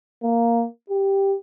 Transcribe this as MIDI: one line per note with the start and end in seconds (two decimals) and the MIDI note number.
0.23 0.64 58
0.90 1.35 67